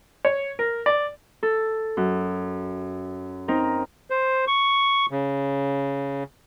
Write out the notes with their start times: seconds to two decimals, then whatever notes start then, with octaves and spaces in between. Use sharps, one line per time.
0.25 C#5
0.59 A#4
0.86 D5
1.43 A4
1.97 F#2
3.48 C4 D#4 A#4
4.10 C5
4.47 C#6
5.11 C#3